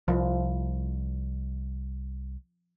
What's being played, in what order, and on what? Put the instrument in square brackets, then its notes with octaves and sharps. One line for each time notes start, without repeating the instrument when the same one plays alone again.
[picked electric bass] C2 [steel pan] F3